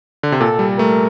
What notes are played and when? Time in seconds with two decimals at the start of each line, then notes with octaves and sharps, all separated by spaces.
0.23 D3
0.32 C3
0.40 A#2 A4
0.59 G3
0.79 A3 A#4